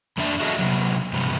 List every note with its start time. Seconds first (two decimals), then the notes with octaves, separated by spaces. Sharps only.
0.18 F2 D3 D4 D5 E5
0.40 F#4 G#4 A4 D#5 E5
0.59 C3 F#3
1.13 G2 C3 F3 G3